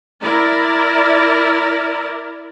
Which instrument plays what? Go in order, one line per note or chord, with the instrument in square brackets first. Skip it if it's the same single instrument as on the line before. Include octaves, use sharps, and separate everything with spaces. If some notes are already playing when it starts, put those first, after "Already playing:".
[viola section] E4 A#4 D5